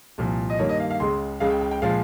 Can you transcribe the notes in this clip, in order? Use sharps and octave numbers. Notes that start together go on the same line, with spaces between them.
C2 A#2 F3
D#5
G2 D#3 A#3 C#5
D#5
F5
F5
C#2 C#3 G#3 C6
C#2 C#3 G#3 F5
G5
G5
G5
A#2 F3 G#3 F5